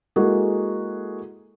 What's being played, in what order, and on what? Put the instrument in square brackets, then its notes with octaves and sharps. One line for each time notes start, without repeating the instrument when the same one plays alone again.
[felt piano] G#3 A#3 E4 F#4 G#4 A4